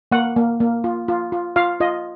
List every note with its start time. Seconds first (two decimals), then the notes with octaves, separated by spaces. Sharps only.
0.12 A#3 F#5
0.36 A#3
0.60 A#3
0.84 F4
1.08 F4
1.32 F4
1.56 F4 F5
1.80 F4 D#5